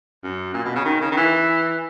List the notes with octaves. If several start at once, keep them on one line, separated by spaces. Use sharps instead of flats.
F#2
A#2
B2
C#3
D#3
C#3
D#3
E3